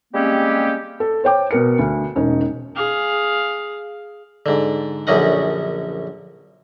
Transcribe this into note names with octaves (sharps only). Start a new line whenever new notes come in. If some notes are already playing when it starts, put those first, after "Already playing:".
G3 G#3 A#3 C4 C#4 G4
A4
C5 C#5 G5 D6
B2 A#4 C#7
D2
E1 C#4 D#4
G#4 F5
G#2 D3
A#1 F#2 D3 C#4 D#5 F#5